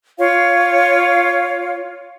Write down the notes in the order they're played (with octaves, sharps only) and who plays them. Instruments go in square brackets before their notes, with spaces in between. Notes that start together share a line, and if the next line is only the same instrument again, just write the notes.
[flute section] F4 C#5 F5